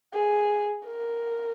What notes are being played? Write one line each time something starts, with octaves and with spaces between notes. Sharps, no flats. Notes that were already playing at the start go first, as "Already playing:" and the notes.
G#4
A#4